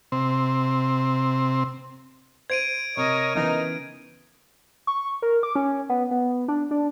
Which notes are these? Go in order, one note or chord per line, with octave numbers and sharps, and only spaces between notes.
C3 C4
C5 G#6 D7 D#7
C3 A#4 C#5 D#5
C#3 E3 B3 D#4 A#4
C#6
A#4
D6
C#4
B3
B3
D4
D4